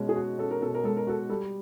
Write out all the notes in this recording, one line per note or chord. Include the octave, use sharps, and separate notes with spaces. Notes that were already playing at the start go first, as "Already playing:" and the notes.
Already playing: B2 G#3 C#4
G#4
F#4
C#4 A4
A#4
B2 A4
A#4
G#3 A4
A#4
F#4 A4
G3 A4